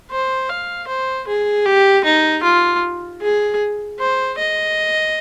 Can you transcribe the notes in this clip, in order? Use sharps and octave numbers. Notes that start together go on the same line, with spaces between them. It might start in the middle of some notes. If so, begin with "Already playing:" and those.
C5
F5
C5
G#4
G4
D#4
F4
G#4
C5
D#5